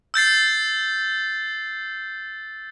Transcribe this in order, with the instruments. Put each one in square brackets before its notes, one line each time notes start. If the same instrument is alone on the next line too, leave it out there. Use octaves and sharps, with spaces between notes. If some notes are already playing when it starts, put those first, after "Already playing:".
[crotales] E6 G6 A6 C7